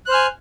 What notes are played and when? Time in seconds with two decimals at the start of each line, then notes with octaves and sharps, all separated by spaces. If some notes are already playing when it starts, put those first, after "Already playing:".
0.06 F#6
0.09 C5
0.11 F6
0.14 G#5